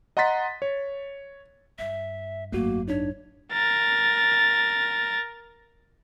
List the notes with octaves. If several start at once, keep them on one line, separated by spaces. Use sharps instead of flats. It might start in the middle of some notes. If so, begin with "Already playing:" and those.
D#5 F#5 A#5 C6 A6 B6
C#5
G2 E5
G#1 F#2 A3 A#3 F#4
D4 D#4 C#5
A#4 A6